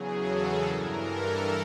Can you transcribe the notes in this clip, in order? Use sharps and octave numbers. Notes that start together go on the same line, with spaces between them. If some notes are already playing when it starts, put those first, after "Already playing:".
Already playing: E2 C#3 F#3 G#4
A4
G2 E3 A#4
A4